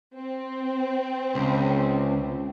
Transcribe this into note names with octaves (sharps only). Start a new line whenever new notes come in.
C4
C#2